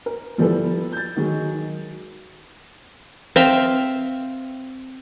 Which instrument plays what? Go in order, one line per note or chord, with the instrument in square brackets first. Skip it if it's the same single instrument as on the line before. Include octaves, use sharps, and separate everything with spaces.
[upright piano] A#4
F3 G3 B3 E4 A4 B4
G6 A6
D#3 F#3 G#3
[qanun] C4 E5 F5 G5